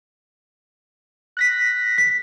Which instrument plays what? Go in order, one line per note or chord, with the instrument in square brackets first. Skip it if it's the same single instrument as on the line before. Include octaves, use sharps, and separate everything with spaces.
[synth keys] F#6 A#6 B6
[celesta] B6